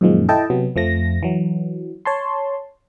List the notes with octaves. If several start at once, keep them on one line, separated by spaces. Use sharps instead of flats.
F#2 A#2 D#3 F3 G#3
E4 A4 D#5 G5 A5
C3 F#3 B3
F2 F3 A3 A#6
E3 F#3
C#5 A5 C6